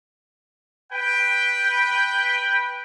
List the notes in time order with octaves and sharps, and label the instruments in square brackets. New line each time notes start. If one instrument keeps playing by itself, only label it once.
[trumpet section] B4 G5